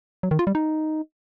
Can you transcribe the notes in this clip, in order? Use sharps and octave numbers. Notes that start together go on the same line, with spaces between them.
F#3
D#3
F4
G3
D#4